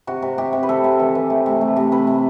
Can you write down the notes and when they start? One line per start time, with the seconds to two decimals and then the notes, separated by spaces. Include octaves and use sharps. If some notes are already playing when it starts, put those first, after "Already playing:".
0.07 C3 F#4
0.22 C3
0.38 C3 G4
0.53 C3
0.63 B4
0.69 C3 A4
0.84 C3
1.00 E3
1.15 E3
1.30 A3
1.46 C3
1.61 A3
1.76 C3
1.92 C3 B4
2.07 C3